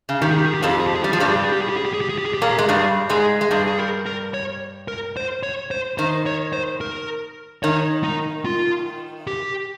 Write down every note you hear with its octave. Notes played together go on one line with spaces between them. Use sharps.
C#3
D#3 G4
G#4
G4
G#4
G4
F2 F3 G#4
G4
G#4
G4
G#4
G3 G4
F3 G#4
G2 G3 G4
G#4
G4
G#4
G4
G#4
G4
G#4
G4
G#4
G4
G#4
G4
G#4
G4
A#2 A#3 G#4
G4
G#3
G2 G3 G#4
G#2 G#3 G#4
G#3
G2 G3 G#4
G#4
A#4
A#4
C#5
A#4
C5
C#5
C5
D#3 C5
C#5
C5
A#4
D#3 C#5
D#4
F4
G4